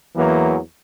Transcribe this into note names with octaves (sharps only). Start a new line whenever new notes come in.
E2 E3 F#3 A#3